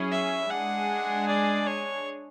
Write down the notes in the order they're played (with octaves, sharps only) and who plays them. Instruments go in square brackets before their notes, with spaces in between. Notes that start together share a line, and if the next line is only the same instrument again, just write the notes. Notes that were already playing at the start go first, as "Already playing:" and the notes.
Already playing: [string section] F#3 C#4 E4 G#4
[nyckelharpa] E5
[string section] G#3 D4 G#4 [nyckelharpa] F#5
[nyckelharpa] D5
C#5